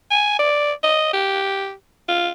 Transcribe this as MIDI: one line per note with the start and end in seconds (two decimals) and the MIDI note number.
0.11 0.38 80
0.39 0.72 74
0.83 1.12 75
1.13 1.72 67
2.09 2.30 65